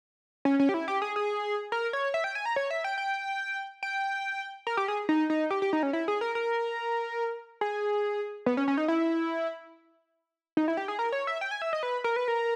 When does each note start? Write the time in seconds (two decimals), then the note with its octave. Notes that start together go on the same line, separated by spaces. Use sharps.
0.45 C#4
0.59 C#4
0.69 G4
0.74 E4
0.88 G4
1.02 G#4
1.16 G#4
1.72 A#4
1.93 C#5
2.14 E5
2.24 G5
2.35 G#5
2.46 A#5
2.56 C#5
2.71 E5
2.84 G5
2.98 G5
3.83 G5
4.67 A#4
4.77 G4
4.88 G#4
5.09 D#4
5.30 D#4
5.51 G4
5.62 G4
5.73 D#4
5.83 C#4
5.93 E4
6.08 G#4
6.21 A#4
6.35 A#4
7.61 G#4
8.46 B3
8.57 C#4
8.68 C#4
8.77 D#4
8.88 E4
10.57 D#4
10.68 E4
10.77 G4
10.88 G#4
10.99 A#4
11.12 C#5
11.27 E5
11.41 G5
11.51 G#5
11.62 E5
11.73 D#5
11.83 B4
12.04 A#4
12.16 B4
12.28 A#4